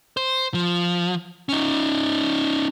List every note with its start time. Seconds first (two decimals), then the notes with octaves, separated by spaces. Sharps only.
0.17 C5
0.54 F3
1.49 C#4 D#4